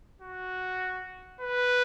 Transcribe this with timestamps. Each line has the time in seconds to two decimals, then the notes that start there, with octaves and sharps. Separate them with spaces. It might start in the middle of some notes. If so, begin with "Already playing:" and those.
0.21 F#4
1.41 B4